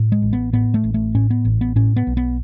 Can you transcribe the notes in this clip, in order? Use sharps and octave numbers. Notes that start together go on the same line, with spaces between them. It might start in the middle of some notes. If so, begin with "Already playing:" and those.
Already playing: A2
G#3
A1
B3
A2 B3
A3
A1
A3
A2 C#4
B3
A1
B3
A2 C#4
B3
B1
B3